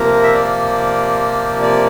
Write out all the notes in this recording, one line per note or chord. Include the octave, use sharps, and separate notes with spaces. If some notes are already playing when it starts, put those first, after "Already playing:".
Already playing: C3 F3 A#3 A#4
E5
D5
D5